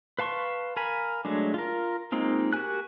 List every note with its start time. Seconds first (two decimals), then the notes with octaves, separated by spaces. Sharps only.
0.19 B4 F5 A5 C6 C#6
0.77 A#4 F5 G#5 B5
1.25 F#3 G#3 A3 D4
1.54 F4 A#4
2.12 G#3 A#3 C4 D#4 F4
2.53 F#4 G4 A#4 G#5 F#6